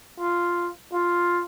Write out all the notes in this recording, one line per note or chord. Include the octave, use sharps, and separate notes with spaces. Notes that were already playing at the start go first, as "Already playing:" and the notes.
F4
F4